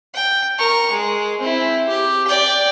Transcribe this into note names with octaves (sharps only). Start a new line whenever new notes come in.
G5
A#4 C#6
G#3
C4 E4
G4
D5 G5